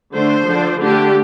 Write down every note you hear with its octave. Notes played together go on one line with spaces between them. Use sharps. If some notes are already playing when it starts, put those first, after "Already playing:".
D3 A3 D4 C5
D3 F3 D4
D3 A3 D4 G4